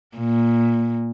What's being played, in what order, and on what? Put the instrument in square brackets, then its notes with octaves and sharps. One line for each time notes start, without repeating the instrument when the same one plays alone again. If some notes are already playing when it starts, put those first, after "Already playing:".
[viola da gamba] A#2